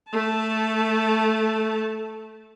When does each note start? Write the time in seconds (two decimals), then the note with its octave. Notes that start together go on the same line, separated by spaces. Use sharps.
0.11 A3 A5